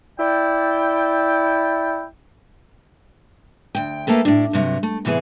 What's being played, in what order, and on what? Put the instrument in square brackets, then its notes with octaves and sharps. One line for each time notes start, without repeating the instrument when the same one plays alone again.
[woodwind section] E4 D5 G5
[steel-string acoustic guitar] D2 G5
A3 A#3 A4 B4
A2 D4
G2 C3 F3 F#3
A3
A2 C3 E3 B3 G#4